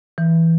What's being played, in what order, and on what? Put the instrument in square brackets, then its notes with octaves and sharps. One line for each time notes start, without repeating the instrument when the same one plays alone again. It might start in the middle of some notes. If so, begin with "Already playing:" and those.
[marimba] E3